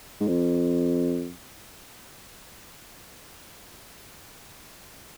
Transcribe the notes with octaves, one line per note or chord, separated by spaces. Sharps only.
G#2
F2